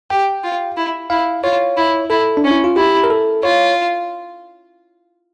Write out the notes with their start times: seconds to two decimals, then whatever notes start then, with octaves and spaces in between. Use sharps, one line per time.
0.10 G4 G5
0.44 F4
0.77 E4
1.10 E4 F5
1.44 F4 C#5
1.77 E4
2.10 E4 A4
2.37 D4
2.44 C#4
2.51 E4
2.64 F4
2.76 E4 G4
3.04 A#4
3.10 A4
3.43 F4 C#5